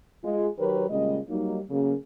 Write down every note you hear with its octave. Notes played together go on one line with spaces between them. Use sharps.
G#3 F4
D#3 F#3 G4 A#4 B4 C#5
A#2 C#3 G3 G#3 D#5
F#3 G3 A#3 D#4
C#3 F#3 A#3